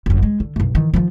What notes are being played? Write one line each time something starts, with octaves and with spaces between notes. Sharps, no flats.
G1 F#2
G#3
D3
B1 F#2
D#3 E3
D#3 F3